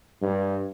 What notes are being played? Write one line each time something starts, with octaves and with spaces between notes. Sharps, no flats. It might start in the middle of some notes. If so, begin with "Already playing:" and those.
G2